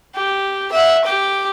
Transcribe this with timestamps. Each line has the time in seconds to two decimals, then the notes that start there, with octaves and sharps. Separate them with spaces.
0.15 G4
0.72 E5 F#5
1.05 G4 D6